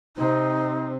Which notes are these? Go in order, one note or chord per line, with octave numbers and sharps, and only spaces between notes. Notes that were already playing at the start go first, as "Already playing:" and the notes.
C3 C4 D#4